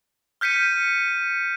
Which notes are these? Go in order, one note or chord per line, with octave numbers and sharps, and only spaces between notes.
F6 G6 B6 C#7 D#7